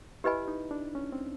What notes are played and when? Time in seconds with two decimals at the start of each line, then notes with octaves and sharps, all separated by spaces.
0.24 E4 G4 B4 D#5 G#5 B5
0.48 D#4
0.71 D4
0.95 C#4
1.12 C4